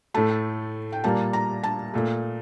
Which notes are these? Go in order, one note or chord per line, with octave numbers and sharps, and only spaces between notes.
A2 A3 A5
G5
A#2 G3 A#3 A5
A#5
A5
A#2 A3